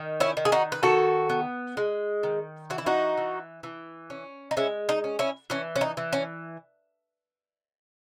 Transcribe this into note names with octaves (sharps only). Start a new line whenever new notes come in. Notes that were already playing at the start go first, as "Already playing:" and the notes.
Already playing: D#3
C#4 E4
D#3
G#4
D#4 F#4
B4
D#3 F#4 A4
B3
G#3
D#3
E3 F#4
E4
D#4 F#4
E3
E3
C#4
D#4
G#3 C#4 E4
D#4
C#4
C#4 E4
E3 C#4
C#4
D#4
E3
C#4